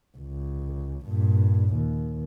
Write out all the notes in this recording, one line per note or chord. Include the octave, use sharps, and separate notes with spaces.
C#2
G2 A#2
D#2